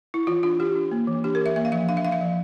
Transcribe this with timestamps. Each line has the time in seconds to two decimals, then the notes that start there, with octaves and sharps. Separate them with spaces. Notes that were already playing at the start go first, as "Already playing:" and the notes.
0.14 E4
0.27 E3 F4
0.43 D4 F4
0.60 D4 G4
0.76 D4
0.92 A#3
1.07 E3
1.24 D4 G4
1.35 A#4
1.41 E3 E5
1.56 A#3 E5
1.65 F5
1.72 F3 E5
1.89 D4 F5
1.97 E5
2.05 D4 F5
2.12 E5
2.21 F3